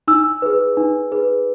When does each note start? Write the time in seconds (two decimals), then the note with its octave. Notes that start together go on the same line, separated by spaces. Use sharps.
0.08 D#4 E6
0.42 G#4 B4
0.77 D#4
1.12 G#4 B4